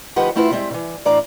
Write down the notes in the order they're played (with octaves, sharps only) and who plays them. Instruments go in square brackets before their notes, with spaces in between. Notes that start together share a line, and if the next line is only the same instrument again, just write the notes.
[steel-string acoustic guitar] D2 F3 D#4 G4 B4 F#5
A3 C4 E4 F4 B4 F#5
G3 G#3 C4 E5
C#3 E3
A2 E3 D4 D5 F5 A#5